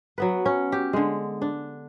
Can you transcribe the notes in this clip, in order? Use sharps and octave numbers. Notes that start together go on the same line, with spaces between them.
F#3 B3 B4
C#4
G4
D3 G#3
D4